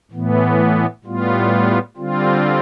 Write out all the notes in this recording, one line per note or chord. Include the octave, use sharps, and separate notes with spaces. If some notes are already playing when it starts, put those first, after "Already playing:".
A2 E3 B3
A2 G3 B3 F4
D3 G3 C4 F4